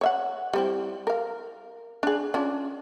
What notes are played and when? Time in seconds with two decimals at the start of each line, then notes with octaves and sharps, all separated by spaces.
0.01 C#5 E5 F#5
0.53 G3 C4 E4
1.07 A#4 F5
2.03 D4 G#4
2.34 C#4 D4 F4